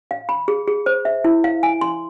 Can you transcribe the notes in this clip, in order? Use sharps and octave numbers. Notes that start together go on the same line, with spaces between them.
F5
B5
G#4
G#4
C5
E5
E4
F5
G#5
C6